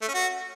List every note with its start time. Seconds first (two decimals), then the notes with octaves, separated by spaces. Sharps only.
0.02 A3
0.08 C#4
0.14 F#4